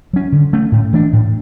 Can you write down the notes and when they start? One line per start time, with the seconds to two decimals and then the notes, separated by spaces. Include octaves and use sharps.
0.13 F#3 C#4
0.32 D3
0.53 A3 C#4
0.72 A2
0.93 E3 A3 D4
1.13 A2